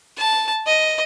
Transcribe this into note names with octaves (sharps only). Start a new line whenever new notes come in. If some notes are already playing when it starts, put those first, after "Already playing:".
A5
D#5